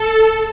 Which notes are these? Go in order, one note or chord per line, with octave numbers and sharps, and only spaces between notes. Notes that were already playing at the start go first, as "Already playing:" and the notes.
Already playing: A4